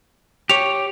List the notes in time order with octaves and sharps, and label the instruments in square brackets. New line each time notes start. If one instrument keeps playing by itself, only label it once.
[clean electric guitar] G4 C#5 [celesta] F7